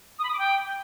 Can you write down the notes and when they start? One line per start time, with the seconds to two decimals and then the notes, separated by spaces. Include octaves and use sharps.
0.18 D#6
0.23 B5
0.28 D#6
0.33 D6
0.38 G5